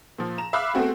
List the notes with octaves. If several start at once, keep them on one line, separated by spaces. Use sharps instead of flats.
A#2 F3
A#5 E7
E5 F5 B5 D6 E6 F#6
A3 B3 C4 F#4 G#4